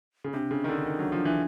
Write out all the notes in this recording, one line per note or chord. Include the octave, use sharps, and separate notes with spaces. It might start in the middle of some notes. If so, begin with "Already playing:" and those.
C#3
C3 D4
C#3
D#3
D3
D#3
F#3
F3
E3